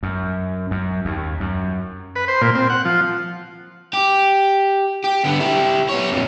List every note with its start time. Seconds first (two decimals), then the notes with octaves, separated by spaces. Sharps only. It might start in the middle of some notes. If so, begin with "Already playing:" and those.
0.03 F#2
0.71 F#2
1.05 D#2
1.40 F#2
2.16 B4
2.28 C5
2.42 A#2
2.55 C4
2.70 F#5
2.85 F3
3.94 G4
5.04 G4
5.25 D3 B3
5.41 E4 G4
5.89 B3 C#5
6.12 F2 A#2